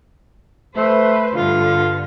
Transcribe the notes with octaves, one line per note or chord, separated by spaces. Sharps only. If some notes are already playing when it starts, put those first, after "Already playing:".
A3 B4 C5
G2 D3 F4